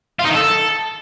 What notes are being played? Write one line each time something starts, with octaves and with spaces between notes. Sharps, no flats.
F4
D#4
D#3
A4